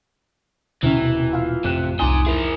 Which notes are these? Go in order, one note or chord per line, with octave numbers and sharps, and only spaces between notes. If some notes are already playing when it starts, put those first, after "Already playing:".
D2 C3 E3 C#4
D#1 B2
F4 F5
A1 F2 C3 F#6
C2 D#4 G#5 C6 D6 D#6
E4 G#4 A#4